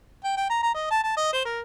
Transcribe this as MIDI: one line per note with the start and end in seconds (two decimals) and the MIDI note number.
0.24 0.33 79
0.37 0.49 79
0.50 0.61 82
0.63 0.72 82
0.74 0.90 75
0.91 1.00 81
1.04 1.15 81
1.17 1.32 75
1.33 1.42 72
1.45 1.61 70